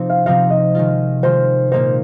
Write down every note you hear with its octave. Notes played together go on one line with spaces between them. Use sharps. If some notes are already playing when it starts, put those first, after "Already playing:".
Already playing: C3 F3 C4 D#4
F5
C3 F3 C4 D#4 F5
D#5
D#3 G#3 F4
D#3 G#3 F4 C5
A#2 A#3 D#4 C5